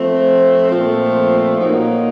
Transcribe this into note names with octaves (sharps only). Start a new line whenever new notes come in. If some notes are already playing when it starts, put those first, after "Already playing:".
Already playing: F3 A3 C4
A#2 F3 A3 C4
A#2 F#3 A#3 D#4